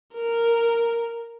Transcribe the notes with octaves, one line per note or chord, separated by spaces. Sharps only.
A#4